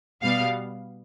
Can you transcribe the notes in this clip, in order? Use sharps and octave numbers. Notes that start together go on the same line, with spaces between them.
B2 G3 B3 F5